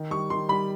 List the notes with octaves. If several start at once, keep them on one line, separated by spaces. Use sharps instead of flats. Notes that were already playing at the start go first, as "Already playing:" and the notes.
Already playing: D#3
G3 C#6
D#3 C6
G3 B5